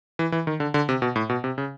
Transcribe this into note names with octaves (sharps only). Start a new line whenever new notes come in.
E3
E3
D#3
D3
D3
C3
B2
A2
B2
C3
C#3